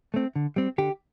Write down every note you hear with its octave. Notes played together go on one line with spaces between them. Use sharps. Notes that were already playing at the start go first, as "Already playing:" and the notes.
A3 C4
D3
G3 C4
D3 G4